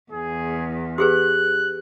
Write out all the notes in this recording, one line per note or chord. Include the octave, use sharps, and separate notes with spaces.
E2 G#4
G4 G#4 B4 F#6